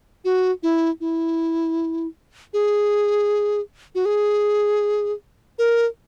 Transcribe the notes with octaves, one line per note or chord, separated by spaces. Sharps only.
F#4
E4
E4
G#4
F#4
G#4
A#4